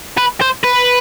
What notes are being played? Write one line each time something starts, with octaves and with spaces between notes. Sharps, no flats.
B4
C5
B4